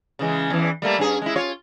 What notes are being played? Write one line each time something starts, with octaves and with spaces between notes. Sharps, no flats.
C#3 E3 G#3
E2 E3
G3 A3 A#3
G2 C#4 G#4
G#3 E4
F4 C#5